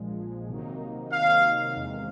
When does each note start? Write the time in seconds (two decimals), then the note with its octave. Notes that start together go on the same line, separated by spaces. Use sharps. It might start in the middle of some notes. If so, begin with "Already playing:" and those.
Already playing: A#1 A#2 F3 G#3
0.49 C3 D#3 F#3 A#3 D#4
1.13 F5
1.76 E2 C3 D#3 G#3